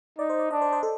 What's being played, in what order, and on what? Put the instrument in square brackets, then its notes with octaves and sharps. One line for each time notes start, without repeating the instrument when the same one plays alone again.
[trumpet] D#4 [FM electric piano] D5
[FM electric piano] C5
D5
[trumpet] D4 [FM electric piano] D#5
[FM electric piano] C5
C5
A4